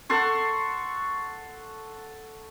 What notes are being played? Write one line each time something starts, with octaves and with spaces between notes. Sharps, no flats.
A4 F#5 C6 C#6